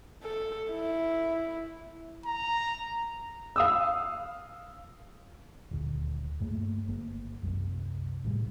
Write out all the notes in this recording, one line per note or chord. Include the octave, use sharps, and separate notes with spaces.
A4
E4
A#5
F5 D#6 E6
D#1 D2
G2 A3 A#3
G1 A#3
C2 F#2 C3
C#2 A2 F3 G3